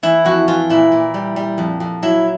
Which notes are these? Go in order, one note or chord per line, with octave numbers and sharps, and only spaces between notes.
E3 E4
F2 F#4
E3 F4
A#2 E4
A#2
G3
G3
F2
F2
F#3 E4